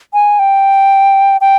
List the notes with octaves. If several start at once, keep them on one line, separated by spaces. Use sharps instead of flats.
G#5
G5
G5